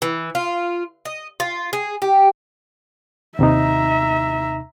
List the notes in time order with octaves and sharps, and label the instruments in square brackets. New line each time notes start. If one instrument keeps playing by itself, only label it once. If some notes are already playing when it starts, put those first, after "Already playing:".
[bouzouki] E3
F4
D#5
F4
G#4
G4
[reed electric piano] D#2 C3 D#4 [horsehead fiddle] E5 A#5